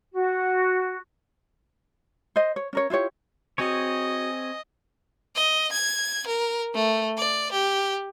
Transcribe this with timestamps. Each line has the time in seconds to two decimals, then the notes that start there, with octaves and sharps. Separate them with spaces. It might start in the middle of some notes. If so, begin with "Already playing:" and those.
0.12 F#4
2.36 C5 D#5
2.56 C#5
2.73 C#4 A#4 C#5
2.90 E4 F4 G4 C#5
3.58 C4 F#4 G#4 C#5 D#5
5.35 D#5
5.72 G#6
6.27 A#4
6.75 A3
7.18 D5
7.52 G4